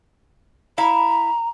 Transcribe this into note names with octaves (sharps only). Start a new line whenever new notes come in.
E4 F5 A#5